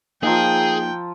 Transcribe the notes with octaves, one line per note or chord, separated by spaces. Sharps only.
F3 A#3 D#4 G#4 G5 A#5 E6